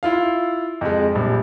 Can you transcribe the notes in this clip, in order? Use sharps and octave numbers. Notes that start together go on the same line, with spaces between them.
E4 F4 F5
F2 G#3
A#1 G3